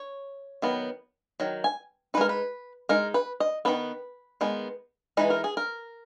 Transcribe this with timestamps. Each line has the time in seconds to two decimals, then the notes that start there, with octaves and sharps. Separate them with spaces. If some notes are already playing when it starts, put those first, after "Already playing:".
Already playing: C#5
0.62 D#3 F#3 B3
1.40 D#3 F#3
1.64 G#5
2.14 D#4 B4
2.17 G#3 A#4
2.29 B4
2.89 G#3 D#4 A#4
3.14 B4
3.40 D#5
3.65 D#3 G#3 B3 B4
4.41 D#3 G#3 B3
5.17 E3 G#3 D#4 B4
5.30 A#4
5.44 G#4
5.57 A#4